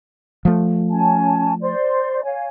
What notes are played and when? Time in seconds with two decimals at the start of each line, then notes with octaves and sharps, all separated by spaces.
0.45 F3 A3
0.91 C#4 G#5 A5
1.61 C5 D5 C6
2.23 C#5 F5 G#5